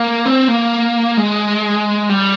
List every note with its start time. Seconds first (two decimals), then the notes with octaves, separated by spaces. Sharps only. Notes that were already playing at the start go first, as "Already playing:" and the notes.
Already playing: A#3
0.25 C4
0.48 A#3
1.17 G#3
2.09 G3